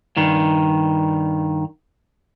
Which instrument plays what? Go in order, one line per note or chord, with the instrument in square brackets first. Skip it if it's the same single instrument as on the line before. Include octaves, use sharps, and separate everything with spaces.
[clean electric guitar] G2 D#3